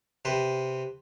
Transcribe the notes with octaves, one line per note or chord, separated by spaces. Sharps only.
C3 B4 C5